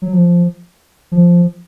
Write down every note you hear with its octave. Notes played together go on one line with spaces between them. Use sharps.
F#3
F3
F3